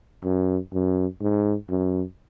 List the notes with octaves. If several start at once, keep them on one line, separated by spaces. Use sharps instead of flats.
F#2
F#2
G#2
F#2